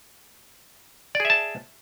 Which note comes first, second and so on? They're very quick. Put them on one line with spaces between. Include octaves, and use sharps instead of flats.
D5 G#4 E5 A5